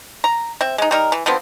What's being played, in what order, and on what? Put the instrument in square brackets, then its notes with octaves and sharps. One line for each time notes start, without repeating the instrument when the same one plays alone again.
[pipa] A#5
C4 E5
G#3 D#4
G3 D#4 A#4
E3
D3 F3 B3 C4